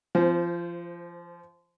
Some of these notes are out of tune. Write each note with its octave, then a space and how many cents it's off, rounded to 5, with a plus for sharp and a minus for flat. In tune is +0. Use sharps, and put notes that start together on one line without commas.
F3 -25 C5 +5